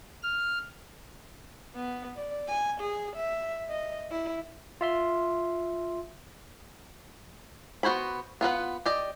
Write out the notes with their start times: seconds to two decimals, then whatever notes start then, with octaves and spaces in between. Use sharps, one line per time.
0.22 F6
1.75 B3
2.17 D5
2.48 G#5
2.81 G#4
3.16 E5
3.70 D#5
4.11 E4
4.81 F4 E5 C6
7.83 B3 F#4 C5 C#5 B5
8.41 B3 F4 B4 F#5
8.86 G4 D5 D#5